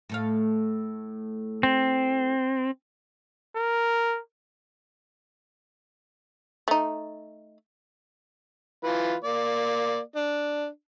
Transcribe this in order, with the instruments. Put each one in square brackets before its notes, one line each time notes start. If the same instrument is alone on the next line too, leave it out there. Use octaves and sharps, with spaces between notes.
[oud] A2 A3 F5
[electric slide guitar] C4
[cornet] A#4
[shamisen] A3 D#4
[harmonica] E3 F4 B4
A#3 D5
D4